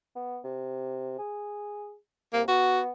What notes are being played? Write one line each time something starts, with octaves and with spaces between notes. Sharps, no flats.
B3
C3
G#4
C2 A#3
B3 F#4